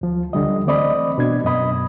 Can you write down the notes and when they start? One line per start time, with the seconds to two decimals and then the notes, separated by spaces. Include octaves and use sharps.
0.01 D2 F3
0.33 C#2 D3 G3 D#5
0.66 E3 A3 C4 D5 D#5 B5
1.18 B2 D4 G#6
1.44 F#2 B2 D#5 B5